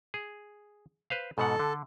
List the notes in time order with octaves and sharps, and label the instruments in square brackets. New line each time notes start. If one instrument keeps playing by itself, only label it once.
[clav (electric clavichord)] G#4
B4 C5 F5
[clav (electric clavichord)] G#2 B2 F#5 [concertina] A4
[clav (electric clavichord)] D3